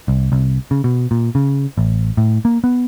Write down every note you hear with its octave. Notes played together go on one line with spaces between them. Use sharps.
C2
C2
C#3
B2
A#2
C#3
A1
A2
A#3
B3